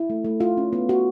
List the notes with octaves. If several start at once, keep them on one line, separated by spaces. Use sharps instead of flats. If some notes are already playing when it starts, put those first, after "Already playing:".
Already playing: E4
A3
A3
F4
C#4
B3
F#4